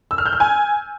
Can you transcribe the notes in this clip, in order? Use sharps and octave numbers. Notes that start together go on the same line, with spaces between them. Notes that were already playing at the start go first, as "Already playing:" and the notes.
E6
F6
G6
F6
G#5